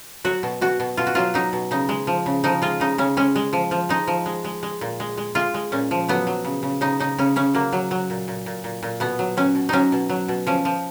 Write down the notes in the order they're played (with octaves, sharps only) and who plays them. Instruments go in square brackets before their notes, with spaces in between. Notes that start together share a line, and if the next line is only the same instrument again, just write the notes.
[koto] F#3 F#4
B2
B2 F#4
B2
B2 F4
F#4
F#3 F4
F#3 D#4
B2
C#3 D#4
G#3
F3
C#3
F3 D#4
G#3 F4
C#3 D#4
C#3 C#4
G#3 C#4
G#3
F3
F3
G#3 D#4
F3
G#3
G#3
G#3
A#2
G#3
G#3
G#3 F4
G#3
A#2 C#4
F3
F#3 B3
F#3
C#3
C#3
C#3 D#4
C#3 D#4
C#3 C#4
C#3 C#4
F#3 A#3
F#3
F#3
A#2
A#2
A#2
A#2
A#2
B2 B3
F#3
F#3 C#4
B2
F#3 C#4 D#4
B2
F#3
B2
F3 C#4
F3